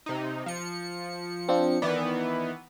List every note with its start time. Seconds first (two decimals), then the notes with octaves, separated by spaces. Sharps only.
0.06 C3 D#4
0.46 F3 C#7
1.49 C4 D4 F4
1.82 D#3 E3 B3 D5